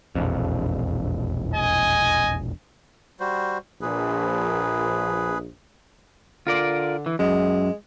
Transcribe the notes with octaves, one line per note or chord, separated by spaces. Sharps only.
E1 A#1 F2
D#5 G#5
G3 F#4 C5
A#1 G#4 B4
D3 F4 A#4 D5
E3
F#2 G#3